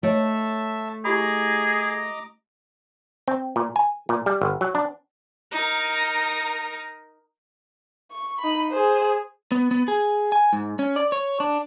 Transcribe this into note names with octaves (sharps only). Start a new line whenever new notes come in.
A3 D#4 C#5 D#5 E5 A5
E4 G4 G#4 D#5 A#5 B5 D6
C4
A#2
G#5
A#2
G3
G1
F#3
D4
D#4 A#4
C#6
D#4 B5
G#4 C5
B3
B3
G#4
G#5
G#2
C#4
D5
C#5
D4